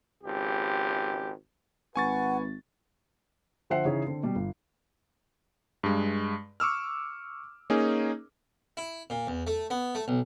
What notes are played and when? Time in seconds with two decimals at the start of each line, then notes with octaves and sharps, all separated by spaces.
0.24 G#1 C#2 G4
1.96 G#1 B4 F#5 G#5 C#6 A6
3.70 D3 F3 C5 E5 F#5 C7
3.85 C#3 E3 D#4 E4 G#4 C#5
4.07 D3 C4
4.23 B2 G3
4.36 G1
5.83 G2 G#3
6.60 C#6 D6 E6 F6
7.70 A#3 C#4 D#4 G#4
8.77 E4
9.10 A#2
9.27 E2
9.47 A3
9.70 B3
9.95 A3
10.08 B1